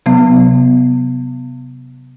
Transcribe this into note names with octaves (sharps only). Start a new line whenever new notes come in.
C3 F#3 B3